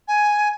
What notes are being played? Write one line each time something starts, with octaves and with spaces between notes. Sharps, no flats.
G#5